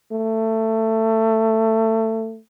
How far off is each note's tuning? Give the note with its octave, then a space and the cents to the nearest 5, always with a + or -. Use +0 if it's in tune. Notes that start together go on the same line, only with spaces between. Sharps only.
A3 +20